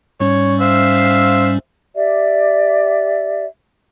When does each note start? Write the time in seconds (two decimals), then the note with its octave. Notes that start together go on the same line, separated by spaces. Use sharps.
0.20 G#2 G3 C#4 C#5
0.61 C5 E5 F5
1.95 G4 D5 E5